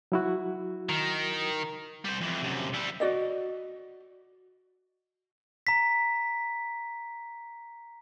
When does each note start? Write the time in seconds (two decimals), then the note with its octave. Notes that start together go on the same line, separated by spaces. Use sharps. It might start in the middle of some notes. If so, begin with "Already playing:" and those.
0.12 F#3 E4 F#4
0.89 D#3
2.04 G3 C5
2.21 F2 E3
2.42 F#2 C3
2.74 G3 E4
3.00 F#4 D5 D#5
5.67 A#5 B6